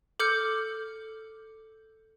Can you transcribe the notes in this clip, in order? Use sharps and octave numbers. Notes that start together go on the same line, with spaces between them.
A4 D6 F6 G6 C#7